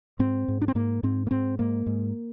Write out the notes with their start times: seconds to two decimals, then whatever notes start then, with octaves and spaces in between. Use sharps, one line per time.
0.19 G#2 C4
0.48 G#2
0.62 D4
0.68 C4
0.75 G#2 A#3
1.03 G#2 C4
1.27 A#3
1.31 G#2 C4
1.59 G#2 A#3
1.86 G#2